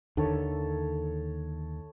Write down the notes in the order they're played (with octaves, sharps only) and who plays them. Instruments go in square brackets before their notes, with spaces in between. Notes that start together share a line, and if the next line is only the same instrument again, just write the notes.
[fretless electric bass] D#2 D3 D#3 [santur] A4 C#5 E5